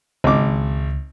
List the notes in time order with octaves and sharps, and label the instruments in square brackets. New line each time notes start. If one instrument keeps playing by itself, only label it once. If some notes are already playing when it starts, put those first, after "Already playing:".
[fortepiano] G#1 D6 [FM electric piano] C#2